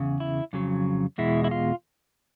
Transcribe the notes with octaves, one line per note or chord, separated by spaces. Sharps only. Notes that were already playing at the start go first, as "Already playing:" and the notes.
Already playing: E2 C#3
E4
F2 C#3 F#3
E2 B2 G#3 E4
E4
F4